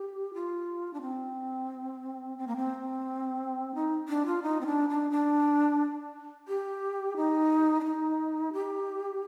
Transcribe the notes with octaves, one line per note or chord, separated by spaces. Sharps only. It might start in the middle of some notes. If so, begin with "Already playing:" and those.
Already playing: G4
F4
D4
C4
C4
A#3
C4
D#4
D4
F4
D#4
C4
D4
D4
D4
G4
D#4
D4
D#4
G4